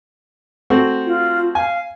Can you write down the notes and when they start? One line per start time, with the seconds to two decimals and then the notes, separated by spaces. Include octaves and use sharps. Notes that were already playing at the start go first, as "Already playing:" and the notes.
0.70 A3 C4 F#4
1.06 F4
1.55 F5 G#5